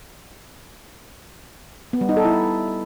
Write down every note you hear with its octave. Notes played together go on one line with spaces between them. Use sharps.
B3
G3
D#4
A4
E4